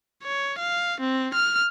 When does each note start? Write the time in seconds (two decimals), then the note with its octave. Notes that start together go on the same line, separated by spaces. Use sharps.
0.23 C#5
0.58 F5
1.00 C4
1.34 F6